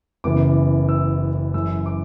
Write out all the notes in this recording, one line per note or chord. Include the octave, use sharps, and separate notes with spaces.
F#1 F#2 C#3 E3 B3 D6
E6
F#2 C#3 E3 E6
D6